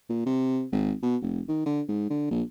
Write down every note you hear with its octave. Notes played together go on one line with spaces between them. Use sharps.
A#2
C3
G#1
B2
F1
D#3
D3
G#2
D3
A#1